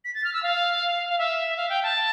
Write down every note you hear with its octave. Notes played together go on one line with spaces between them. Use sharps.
B6
A6
F6
E6
F5
F5
E5
F5
G5
A5